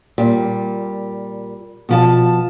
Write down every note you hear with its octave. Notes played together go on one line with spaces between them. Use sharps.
A#2 G3
B2 F3 A5